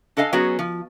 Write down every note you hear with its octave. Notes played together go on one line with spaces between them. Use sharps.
D4 A4 D#5 F5 G#5
F#3 B3 C#4 F#4 G#4
F3